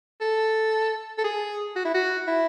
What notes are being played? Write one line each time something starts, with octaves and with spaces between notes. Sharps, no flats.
A4
A4
G#4
F#4
E4
F#4
E4